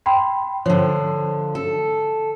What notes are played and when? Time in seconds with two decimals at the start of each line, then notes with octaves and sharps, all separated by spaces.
0.06 G5 B5 C6
0.66 D3 F3 C#5
1.55 A4